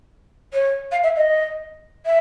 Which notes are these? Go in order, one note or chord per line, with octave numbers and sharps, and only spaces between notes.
C#5
F5
E5
D#5
E5